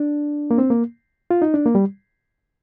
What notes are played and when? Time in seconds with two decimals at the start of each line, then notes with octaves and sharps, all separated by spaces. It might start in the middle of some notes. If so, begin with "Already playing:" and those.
Already playing: D4
0.51 A#3
0.58 C4
0.70 A#3
1.31 F4
1.42 D#4
1.54 D4
1.66 A#3
1.75 G3